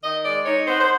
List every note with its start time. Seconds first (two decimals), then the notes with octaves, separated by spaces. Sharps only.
0.03 D#3 D#5
0.25 G#3 D5
0.46 D#4 C#5
0.68 B3 C5
0.81 C5